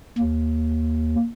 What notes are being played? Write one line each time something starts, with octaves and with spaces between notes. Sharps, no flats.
D#2